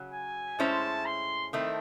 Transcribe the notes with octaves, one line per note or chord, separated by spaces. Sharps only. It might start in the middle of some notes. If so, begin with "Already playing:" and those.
Already playing: C#3 F#3
G#5
A2 G#3 C#4 E4 C5 A5
C6
D#3 A3 C4 E4